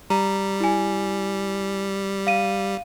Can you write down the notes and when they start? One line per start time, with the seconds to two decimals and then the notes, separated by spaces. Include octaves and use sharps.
0.10 G3 A#5
0.60 E4 G#5
2.27 F5 D#7